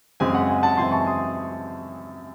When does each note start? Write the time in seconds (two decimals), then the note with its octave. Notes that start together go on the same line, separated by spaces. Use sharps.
0.20 F#2 C#3 G#3 C4 G#5
0.34 F#5
0.49 G#5
0.63 F#5 A5
0.77 F#2 C#3 E3 G#3 C4 G#5 C6
0.92 A5 C#6
1.06 C6 D#6